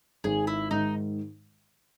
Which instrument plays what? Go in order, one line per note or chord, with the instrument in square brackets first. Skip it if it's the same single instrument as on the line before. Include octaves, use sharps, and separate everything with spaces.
[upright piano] G#1 [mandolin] G#4
[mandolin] E4
[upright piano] G#2 D#3 [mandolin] D#4